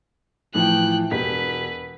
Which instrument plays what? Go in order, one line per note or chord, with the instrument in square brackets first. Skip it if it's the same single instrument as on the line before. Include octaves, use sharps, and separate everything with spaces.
[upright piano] A2 E3 F3 [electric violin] G5 F#6
[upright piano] E1 G4 B6 [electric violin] B4